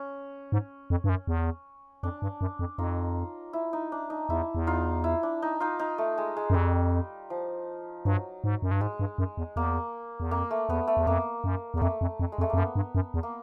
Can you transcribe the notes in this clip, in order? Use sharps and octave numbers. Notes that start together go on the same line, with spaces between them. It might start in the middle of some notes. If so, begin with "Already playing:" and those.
Already playing: C#4
G#2
F2
G2
F#2
E2
F2 D4
G2
F#2
F2
F2 D#4 F4
E4
D#4
D4
D#4
E2 E4
E2
D#4 F4
E4
D4
D#4
D#4 F4
D#4
A3
G#3
G#3
F#2
F2 G3
F3
G2 F#3
G#2
F#2
G2
G#2 G#3
G2
F#2
E2
E2 A#3
E2
F2 A#3
A3
E2 B3
A3
E2
F2 A#3
F#2
E2
F2 A3 A#3
F2
F2
G#3
F2
A3
F2 A#3
F#2 B3
G2
F#2
E2
A#3